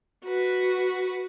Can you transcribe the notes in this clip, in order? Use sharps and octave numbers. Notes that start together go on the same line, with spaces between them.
F#4 B4